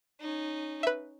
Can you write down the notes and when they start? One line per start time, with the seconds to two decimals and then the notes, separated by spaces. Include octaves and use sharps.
0.20 C#4 D#4
0.83 B4 E5